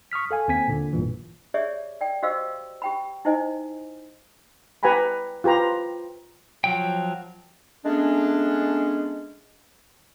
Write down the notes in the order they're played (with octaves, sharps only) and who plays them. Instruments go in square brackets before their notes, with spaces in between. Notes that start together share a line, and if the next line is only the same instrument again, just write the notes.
[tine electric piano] C#6 D#6 F6 B6
A4 F5 G#5
D#2 C4 G#5 B6
A#2 D3
A#1 G2 A#2 E3
[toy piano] G4 G#4 C#5 D5 E5
D5 G5
F#4 G4 C5 D#5 F5 E6
G4 G5 B5
D#4 E4 C5 D#5 G#5
[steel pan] G4 B4 F#5 G#5 A#5 B5
F4 G4 B4 A#5 C6
[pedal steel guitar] F3 F#3 G5
[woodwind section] G#3 A3 B3 C#4 D4